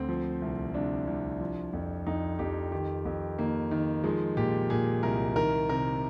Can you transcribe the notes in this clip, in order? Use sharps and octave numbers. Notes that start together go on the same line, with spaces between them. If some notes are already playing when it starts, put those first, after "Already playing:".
Already playing: D2 C4
F3
C2
C2 D4
C2
F3
F2
F2 D#4
F2 G4
D#3 G4
F2
D#3 A#3
D#3
F3 G#3
A#2 G4
A#2 G#4
C2 A#4
D#3 A#4
C3 A#4